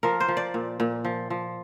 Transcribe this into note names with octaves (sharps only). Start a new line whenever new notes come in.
F3 A#4
C5
F3
D5
A#2
A#2
F3
F3